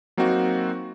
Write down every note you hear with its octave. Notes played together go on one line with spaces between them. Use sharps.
F#3 A#3 C4 D#4 F#4